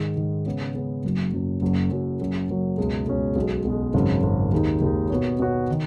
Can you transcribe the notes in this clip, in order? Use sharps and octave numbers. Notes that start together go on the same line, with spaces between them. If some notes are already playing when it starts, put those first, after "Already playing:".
Already playing: G#2 D#3 G#3
G#2 D#3 G#3
C#3 G#3 B3
C#3 G#3 B3
F#1 F#2 F#3
F#1 F#2 F#3
F#1 F#2 F#3 C#4 F#4
F#1 F#2 F#3 C#4 F#4
F#1 F#2 F#3
F#1 F#2 F#3
C#2 B2 G#3 C#4
C#2 B2 G#3 C#4
B1 B2 G#3
B1 B2 G#3
G#1 F#2 C#3
G#1 F#2 C#3
D#2 D#3 G#3 D#4
D#2 D#3 G#3 D#4
B2 B3 F#4 C#5
B2 B3 F#4 C#5
D#3